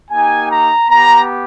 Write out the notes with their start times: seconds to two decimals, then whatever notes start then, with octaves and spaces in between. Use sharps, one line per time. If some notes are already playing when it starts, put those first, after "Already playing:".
0.11 A#3 D#4 G4 G#5
0.50 A#5
0.89 B3 G4 A#5